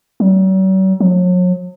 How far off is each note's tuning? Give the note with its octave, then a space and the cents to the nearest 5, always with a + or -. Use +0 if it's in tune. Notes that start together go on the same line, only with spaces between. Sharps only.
F#3 +45
F#3 -40